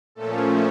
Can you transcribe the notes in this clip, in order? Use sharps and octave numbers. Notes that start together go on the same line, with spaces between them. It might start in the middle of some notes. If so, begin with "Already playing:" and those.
A#2 F3 A3 C#4 A4